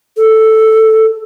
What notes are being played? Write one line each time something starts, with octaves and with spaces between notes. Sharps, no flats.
A4